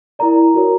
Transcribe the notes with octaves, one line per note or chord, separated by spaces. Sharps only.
E4 A#4 D5 A#5
F#4 A#4 C#5